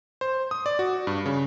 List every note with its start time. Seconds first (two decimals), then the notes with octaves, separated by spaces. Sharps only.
0.21 C5
0.51 D#6
0.66 D5
0.79 F#4
1.07 G2
1.26 C#3